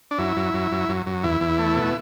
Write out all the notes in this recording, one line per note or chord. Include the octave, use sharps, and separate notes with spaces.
D4
F#2 E4
F#2
F#2
F#2
F#2
F#2
E2 E4
E2
A3
B2